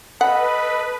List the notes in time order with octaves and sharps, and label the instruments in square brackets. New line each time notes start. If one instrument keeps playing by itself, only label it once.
[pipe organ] A4 D#5 B5 [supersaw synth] B4 [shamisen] F#5